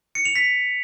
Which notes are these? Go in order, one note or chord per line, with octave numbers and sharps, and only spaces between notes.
C#7
F7
B6